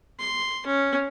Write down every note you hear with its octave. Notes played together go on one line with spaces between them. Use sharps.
C6
C#4